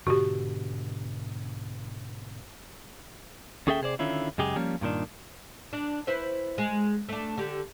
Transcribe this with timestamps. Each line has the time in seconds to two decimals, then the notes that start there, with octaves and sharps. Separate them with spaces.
0.07 G#2 B2 D3 F#4 G4
3.67 D#2 C#4 G#4 A4 E5 G5
3.82 C3 G#4 C5 D5
3.99 D3 D#3 C#4 E4 F4
4.38 F#2 C#3 G#3 G4 G#4
4.56 F3 G3 A#3 C#4
4.81 G2 A#2 D#3 D4
5.73 D4
6.07 E4 B4 C5
6.58 G#3
7.09 A3 D4
7.38 D3 G4